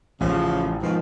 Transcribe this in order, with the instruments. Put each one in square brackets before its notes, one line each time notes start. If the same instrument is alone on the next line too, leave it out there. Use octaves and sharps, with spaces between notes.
[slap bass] A1 [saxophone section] C#3 F3
[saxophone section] G#2 B2 D#3 [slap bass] F3